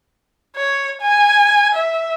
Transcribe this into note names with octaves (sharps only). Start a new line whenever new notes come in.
C#5
G#5
E5